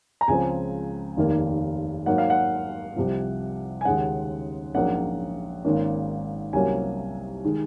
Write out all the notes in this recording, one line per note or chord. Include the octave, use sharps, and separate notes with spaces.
A#5
C#2 C#3 F3 C4 G#5
F1 D#2 D#3 A#3
G#2 F#3 A#3 F#5
F5
F#5
C2 C3 F3
G#5
D#2 C#3 G#3 C#4 F#5
A#1 G#2 F#3 A#3 C#4 F#5
G#1 G#2 D#3 A#3 C#4
C2 C3 F#3 A#3 C#4 G#5
D#3 G#3